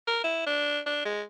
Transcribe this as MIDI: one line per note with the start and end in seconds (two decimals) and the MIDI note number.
0.08 0.21 70
0.24 0.42 64
0.47 0.81 62
0.86 1.01 62
1.05 1.22 56